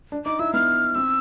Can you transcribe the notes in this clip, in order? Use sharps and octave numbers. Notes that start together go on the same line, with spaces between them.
D4
D#4 D6
E4 E6
B3 F6
C4 E6